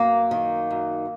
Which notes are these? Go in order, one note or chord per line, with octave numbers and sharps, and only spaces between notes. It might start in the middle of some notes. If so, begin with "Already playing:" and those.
Already playing: F#2 A#3
D#3
F#2